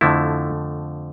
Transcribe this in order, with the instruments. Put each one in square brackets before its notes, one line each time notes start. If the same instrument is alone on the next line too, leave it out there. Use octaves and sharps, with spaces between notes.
[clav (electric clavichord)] F2 D3 F3 A3 E4